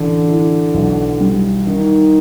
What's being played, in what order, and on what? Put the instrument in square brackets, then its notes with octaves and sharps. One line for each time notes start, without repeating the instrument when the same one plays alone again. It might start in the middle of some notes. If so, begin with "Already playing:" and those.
Already playing: [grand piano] A1 [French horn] D3
[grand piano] E3
B1
G3
[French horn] D#3 [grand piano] D#4